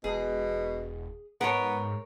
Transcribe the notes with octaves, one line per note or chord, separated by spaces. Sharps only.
E1 B2 G#4
G#2 B3 A#4 C#5